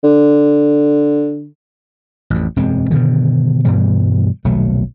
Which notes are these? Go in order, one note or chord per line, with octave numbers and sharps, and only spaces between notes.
D3
A1 F2
E1 F#2 G#3 C4
G2 B2 D3 D#3
G2 B2 E3 G3
D#1 B1 F#3 A3